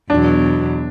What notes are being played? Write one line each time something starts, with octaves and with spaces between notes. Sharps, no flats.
E2 B2 F#3 D4